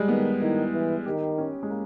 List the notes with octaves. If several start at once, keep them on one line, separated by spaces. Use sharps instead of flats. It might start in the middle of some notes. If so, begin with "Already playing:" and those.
Already playing: G3 G#3
D#3 B3
D#3 E4
E3
D#3 G4
C#4
G#3
A#3